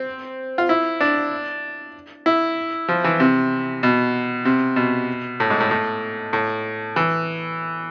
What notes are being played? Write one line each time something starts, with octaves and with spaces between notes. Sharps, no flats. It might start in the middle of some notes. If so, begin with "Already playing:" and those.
Already playing: C4
F4
E4
D4
E4
F3
E3
C3
B2
C3
B2
A2
G#2
A2
A2
A2
E3